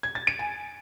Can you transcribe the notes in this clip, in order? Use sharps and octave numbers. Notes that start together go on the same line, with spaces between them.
G#6
A6
D7
G#5